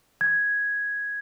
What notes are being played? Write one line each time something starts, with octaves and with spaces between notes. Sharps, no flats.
G#6